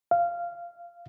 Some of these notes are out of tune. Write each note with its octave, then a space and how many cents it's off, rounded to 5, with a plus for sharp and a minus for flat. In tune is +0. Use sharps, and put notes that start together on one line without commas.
F5 -15